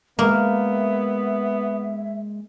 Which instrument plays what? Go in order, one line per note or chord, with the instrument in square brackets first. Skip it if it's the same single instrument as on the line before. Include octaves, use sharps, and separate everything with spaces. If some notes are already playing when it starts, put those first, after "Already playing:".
[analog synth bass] G#3 [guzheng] A#3 [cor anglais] B3 [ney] E5